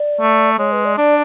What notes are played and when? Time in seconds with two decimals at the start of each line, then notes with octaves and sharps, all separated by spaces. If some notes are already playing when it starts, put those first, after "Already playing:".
Already playing: D5
0.21 A3
0.58 G#3 C#5
0.72 B4
0.85 D5
0.97 D4 D5